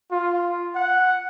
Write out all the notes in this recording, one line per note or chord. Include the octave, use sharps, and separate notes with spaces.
F4
F#5